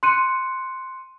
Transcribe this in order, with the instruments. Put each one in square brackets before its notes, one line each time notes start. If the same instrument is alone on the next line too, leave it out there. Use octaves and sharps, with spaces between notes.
[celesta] C6 F#6 C#7 D#7